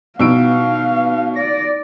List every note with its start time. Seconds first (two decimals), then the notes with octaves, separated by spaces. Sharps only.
0.19 B2 G3 B3 D#4 E4 F5 E6 D7
1.36 D5 A#6